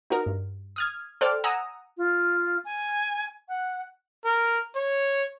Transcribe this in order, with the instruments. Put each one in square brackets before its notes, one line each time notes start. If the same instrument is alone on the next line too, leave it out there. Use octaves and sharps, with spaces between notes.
[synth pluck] D#4 F#4 A#4
G2
D#6 F6 G#6
A4 C5 D5 G5 F6
F#5 G#5 A#5 D#6 E6
[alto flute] F4
G#5
F#5
[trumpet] A#4
C#5